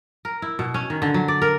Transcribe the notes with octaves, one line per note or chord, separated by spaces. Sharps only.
A#4
E4
B2
C#4
D#3
D3
F#3
D5
A#4